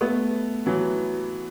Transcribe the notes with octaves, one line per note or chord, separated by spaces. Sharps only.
A3 B3
E3 F#3